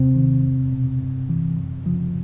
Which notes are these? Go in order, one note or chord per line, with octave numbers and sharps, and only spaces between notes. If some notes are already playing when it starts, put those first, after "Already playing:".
Already playing: D#2 C3 C4
D#3
E2
B2
G2
E3
F#2
C#3 F3